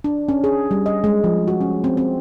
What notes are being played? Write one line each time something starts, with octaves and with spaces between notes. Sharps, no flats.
D4
C#4
G#4
G3
D#5
G#3
F3
F#4
C#4
C4
C4